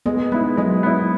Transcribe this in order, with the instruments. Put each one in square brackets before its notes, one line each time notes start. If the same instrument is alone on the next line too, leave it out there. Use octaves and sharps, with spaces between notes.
[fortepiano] G#3 [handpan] B3
[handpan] G#3 [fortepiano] B3 E4
[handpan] F#3 [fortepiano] G#3
[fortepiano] B3 E4